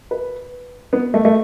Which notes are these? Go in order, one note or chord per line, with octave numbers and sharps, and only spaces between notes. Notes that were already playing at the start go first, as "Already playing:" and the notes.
B4
B3
A3
A3